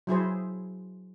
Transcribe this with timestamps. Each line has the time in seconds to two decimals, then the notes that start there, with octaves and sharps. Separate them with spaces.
0.07 F#3 E4 G#4 C5